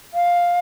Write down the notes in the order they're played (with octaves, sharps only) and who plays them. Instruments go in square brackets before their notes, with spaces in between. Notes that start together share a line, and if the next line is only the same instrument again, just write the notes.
[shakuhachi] F5